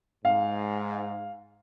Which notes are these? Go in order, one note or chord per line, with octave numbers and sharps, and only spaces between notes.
G#2 F5